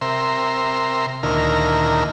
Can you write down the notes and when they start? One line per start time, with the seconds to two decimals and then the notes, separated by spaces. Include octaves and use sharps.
0.01 C3 A#4 E5 C6
1.23 D2 A#2 D#3 E4 A#4 F6